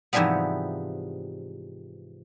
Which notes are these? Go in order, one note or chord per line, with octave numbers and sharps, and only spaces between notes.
G#2 C3 E3 F3 G3 B3